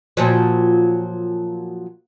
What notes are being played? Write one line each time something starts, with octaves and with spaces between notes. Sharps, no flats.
A#2 F3 F#3